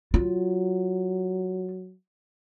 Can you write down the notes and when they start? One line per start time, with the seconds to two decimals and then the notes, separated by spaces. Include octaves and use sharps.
0.14 F#3 F4